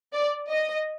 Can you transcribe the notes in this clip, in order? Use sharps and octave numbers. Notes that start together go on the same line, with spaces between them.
D5
D#5